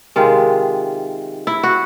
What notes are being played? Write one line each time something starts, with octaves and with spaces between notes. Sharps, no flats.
C3 D#3 G#3 F4
E4
F#4